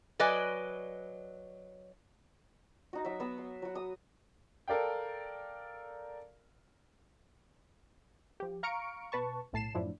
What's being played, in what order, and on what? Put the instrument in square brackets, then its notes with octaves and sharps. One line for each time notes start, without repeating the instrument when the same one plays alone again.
[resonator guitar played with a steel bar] F#3 B4 D5 D#5 G#5
[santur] D#4 F#4
F#3 E5
B3 E6
C6
F#3 F#4
D#6
[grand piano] A4 A#4 D5 F5 G5
[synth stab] F3 G4
F5 A#5 C#6 F6 C#7 D7
B2 B4 A5 C#6
B1 A2 A5 C7 E7
F#2 A2 F3 D4 E4